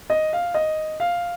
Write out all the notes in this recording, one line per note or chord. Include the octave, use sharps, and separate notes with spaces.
D#5
F5
D#5
F5